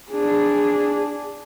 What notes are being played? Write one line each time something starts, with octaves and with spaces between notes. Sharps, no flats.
D4 G#4